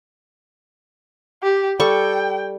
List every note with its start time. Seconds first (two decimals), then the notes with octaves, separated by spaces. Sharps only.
1.43 G4
1.80 G3 A4 G5 C#6